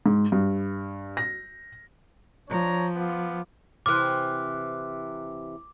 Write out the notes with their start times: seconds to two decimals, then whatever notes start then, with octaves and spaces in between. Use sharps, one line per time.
0.06 G#2
0.32 G2
1.17 A#6
2.49 F3 D4 C#5 A#5
2.96 B3 F4 D6
3.86 C3 E3 D6 F6 F#6